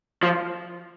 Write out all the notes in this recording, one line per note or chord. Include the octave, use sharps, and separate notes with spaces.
F3